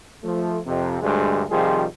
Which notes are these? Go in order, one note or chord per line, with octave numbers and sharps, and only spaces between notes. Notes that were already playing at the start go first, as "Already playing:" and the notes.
F3 A3
F2 C3
D2 G2 G#3
C3 D#3 F3 G3 F4 G#4